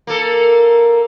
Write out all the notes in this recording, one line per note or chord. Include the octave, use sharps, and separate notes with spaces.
A#3 A4